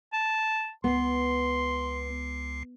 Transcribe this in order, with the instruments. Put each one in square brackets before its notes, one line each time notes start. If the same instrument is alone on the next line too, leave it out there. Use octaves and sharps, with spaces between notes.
[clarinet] A5
[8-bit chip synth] C#2 C7 [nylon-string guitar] B3 [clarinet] C6